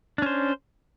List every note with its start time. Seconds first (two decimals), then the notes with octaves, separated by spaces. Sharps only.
0.18 D4
0.22 C#4
0.26 C5